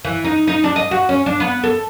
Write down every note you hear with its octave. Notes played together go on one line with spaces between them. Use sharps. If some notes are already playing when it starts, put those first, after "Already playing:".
E3
D#4
D#4
D4
D#5
F#4
C#4
D4
B3
A4